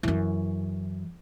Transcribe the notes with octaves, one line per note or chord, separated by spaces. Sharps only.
F#2 E3